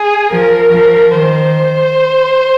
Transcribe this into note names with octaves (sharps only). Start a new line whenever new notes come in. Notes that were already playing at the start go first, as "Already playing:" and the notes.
Already playing: G#4
F3 A#4
F3
D#3 C5